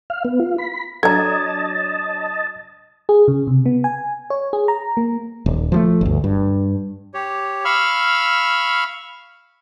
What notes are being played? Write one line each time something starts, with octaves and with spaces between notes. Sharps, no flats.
F5
B3
F4
B5
F#3 D4 A4 D#5 A5 A#5 G#6
G#4
C#3
C3
B3
G#5
C#5
G#4
A#5
A#3
D#1
F3 F#3 A3
G1 D2
G2
G4 C#5
F5 B5 C#6 E6 F6